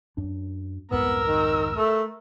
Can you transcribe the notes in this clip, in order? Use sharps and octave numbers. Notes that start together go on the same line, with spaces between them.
F#2 D4
C2 F2 G#2 B3 A#4 E6
D#3
A3